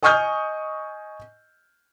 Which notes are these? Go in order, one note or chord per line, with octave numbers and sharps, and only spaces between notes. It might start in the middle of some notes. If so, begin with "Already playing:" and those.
D#5 G#5 C#6 D#6 F6 G6